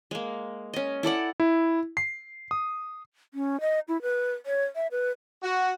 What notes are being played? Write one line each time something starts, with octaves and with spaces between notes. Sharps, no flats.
G#3 A#3
C#4 D#5
E4 A4 D5 F#5
E4
C7
D#6
C#4
D#5
E4
B4
C#5
E5
B4
F#4